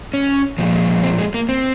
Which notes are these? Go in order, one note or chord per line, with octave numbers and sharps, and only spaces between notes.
C#4
A#2 F3 G#3
C4
G#3
A#3
C4